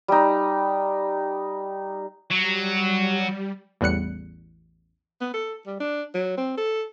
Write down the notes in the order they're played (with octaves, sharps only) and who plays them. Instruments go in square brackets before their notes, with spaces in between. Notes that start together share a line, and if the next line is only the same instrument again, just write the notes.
[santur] G3 D#4
[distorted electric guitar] F#3 [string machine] G3
[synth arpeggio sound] A1 E2 G3 F#6 C#7
[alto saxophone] B3
A4
G3
D4
F#3
C4
A4